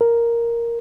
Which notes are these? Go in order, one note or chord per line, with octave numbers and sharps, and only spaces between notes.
A#4